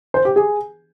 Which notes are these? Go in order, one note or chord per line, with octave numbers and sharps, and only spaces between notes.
C5
G4
G#4